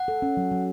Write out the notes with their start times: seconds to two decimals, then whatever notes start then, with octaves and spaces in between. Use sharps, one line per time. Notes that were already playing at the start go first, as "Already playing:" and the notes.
Already playing: F#5
0.08 A4
0.22 C#4
0.37 F#3
0.52 F#3